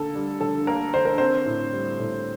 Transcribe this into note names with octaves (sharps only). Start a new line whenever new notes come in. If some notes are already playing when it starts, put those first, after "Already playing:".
Already playing: D3 A#3 A4
G3
D3 A4
A#3 A#4
D3 C5
A#4
C4 C5
A2
G3
A2